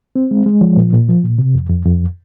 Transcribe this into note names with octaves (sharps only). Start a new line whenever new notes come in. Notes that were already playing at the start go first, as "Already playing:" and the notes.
C4
G#3
G#3
F3
A#2
A#2
F3
A#2
C3
F2
F2
F2